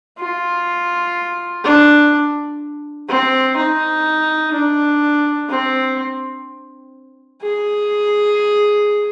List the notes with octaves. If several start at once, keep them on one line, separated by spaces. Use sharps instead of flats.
F4
D4
C4
D#4
D4
C4
G#4